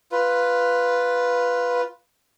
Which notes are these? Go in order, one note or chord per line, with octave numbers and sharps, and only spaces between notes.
F4 B4